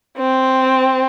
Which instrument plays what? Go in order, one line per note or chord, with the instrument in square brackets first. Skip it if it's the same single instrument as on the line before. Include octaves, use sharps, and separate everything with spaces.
[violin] C4